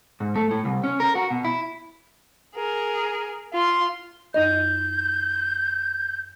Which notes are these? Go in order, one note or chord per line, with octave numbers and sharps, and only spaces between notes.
G#2
A3
A2
C2
C#4
A#4
F#4
B2
E4
G#4 A#4
F4 C6
F#2 D#4 D#5 G6